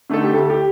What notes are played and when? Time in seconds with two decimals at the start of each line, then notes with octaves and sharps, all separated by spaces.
0.10 D3 A3 D#4 A4
0.23 G4
0.33 D2 A4
0.50 G4